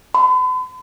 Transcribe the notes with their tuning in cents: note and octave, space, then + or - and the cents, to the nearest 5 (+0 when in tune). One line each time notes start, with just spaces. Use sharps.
B5 +45